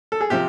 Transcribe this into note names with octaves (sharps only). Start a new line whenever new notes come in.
A4
G#4
C3 F3 G4